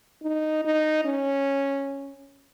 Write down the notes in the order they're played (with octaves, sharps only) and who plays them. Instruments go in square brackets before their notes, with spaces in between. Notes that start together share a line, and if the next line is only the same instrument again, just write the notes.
[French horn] D#4
D#4
C#4